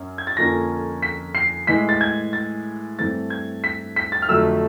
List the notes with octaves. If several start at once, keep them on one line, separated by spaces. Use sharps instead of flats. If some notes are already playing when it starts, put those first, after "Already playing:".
Already playing: F#2 C#4
G#6
A6
F2 D3 F3 A#3 C#4 A#6
B6
C7
A2 E3 G#3 B6
A6
G#6
A6
G2 E3 A3 C4 A6
G#6
B6
B6
A6
F6
F2 D3 F#3 A3 E6